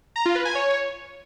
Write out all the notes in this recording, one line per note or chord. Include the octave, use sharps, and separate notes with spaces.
A#5
F4
B4
G#5
C#5